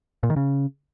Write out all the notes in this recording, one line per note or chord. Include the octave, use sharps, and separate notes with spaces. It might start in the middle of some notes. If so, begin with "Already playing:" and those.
A#2
D#3
C#3